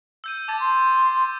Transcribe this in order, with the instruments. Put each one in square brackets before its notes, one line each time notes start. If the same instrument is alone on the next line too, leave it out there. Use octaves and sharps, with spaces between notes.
[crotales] E6 G6 D#7
[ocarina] A5 [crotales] D6 G#6 A6
[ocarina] C6